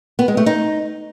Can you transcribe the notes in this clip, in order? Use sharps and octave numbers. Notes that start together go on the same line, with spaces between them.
B3
G#3
A3
D#4